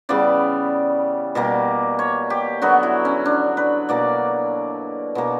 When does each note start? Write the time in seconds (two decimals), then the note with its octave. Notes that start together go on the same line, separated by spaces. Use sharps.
0.09 C#3 E3 G3 B3 D5
1.35 B2 G3 A#3
1.99 C#5
2.30 G4
2.62 D3 F#3 B3 F#4
2.83 E4
3.05 C#4
3.26 D4
3.57 B4
3.89 B2 A#3 D5
5.15 B2 A#3